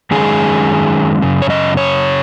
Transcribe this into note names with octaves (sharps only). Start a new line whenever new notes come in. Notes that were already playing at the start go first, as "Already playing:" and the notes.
F#2 D#3 G#3 C#4 G#4
F#2 C#3
C#5
D#5
C#5